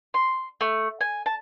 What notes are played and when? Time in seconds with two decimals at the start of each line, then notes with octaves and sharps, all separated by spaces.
0.14 C6
0.61 A3
1.01 G#5
1.26 A5